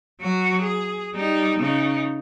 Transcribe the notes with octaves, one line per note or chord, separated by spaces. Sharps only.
F#3 F#4
G#4
G3 D#4
C#3 D#4